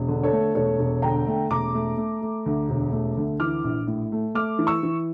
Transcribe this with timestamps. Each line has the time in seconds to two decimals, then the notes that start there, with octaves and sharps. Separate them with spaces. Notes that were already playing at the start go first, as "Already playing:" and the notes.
Already playing: E1
0.08 D3
0.23 A4 C#5
0.32 A3
0.55 E1 A4 C#5
0.79 E1
1.02 D3 G5 A#5
1.27 A3
1.50 E1 A#5 D6
1.74 A3
1.97 A3
2.22 A3
2.46 D2
2.69 E1
2.92 A3
3.17 D2
3.40 E3 D6 F6
3.64 A#1
3.87 A2
4.12 A3
4.35 A3 D6 F6
4.59 E3
4.67 C#6 E6
4.83 E3